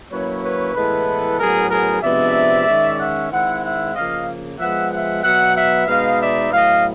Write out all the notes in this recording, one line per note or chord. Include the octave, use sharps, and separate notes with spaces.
F#3 A#3 C#4 E4 B4 C#5
B4 C#5
A2 E3 G#3 B3 E4 A4 B4
A2 F#3 B3 G#4 A#4
G#4 A#4
C3 F3 G#3 B3 D4 D5 E5
D#3 G#3 C#4
E5 F#5
D#3 G#3 C4 E4 E5 F#5
E5 F#5
C#3 F3 A#3 D#5 F5
F3 G#3 B3 E5 F#5
E5 F#5
B2 F#3 B3 E5 F#5
E5 F#5
B2 G#3 B3 D#4 D#5 F5
D5 E5
A2 F#3 B3 D#5 F5